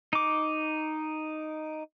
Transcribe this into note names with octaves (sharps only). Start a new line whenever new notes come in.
D#4 D6